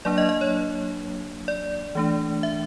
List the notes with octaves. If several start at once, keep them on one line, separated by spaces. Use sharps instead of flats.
F#3 A#3 D4 D5
D#5
D#5
C#5
D5
E3 A3 D4
E5